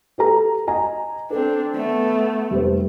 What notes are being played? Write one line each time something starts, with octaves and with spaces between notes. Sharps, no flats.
G4 A4 A#5
D#5 G#5 A#5
C4 D4 A4
A3 B3
F1 G3 C5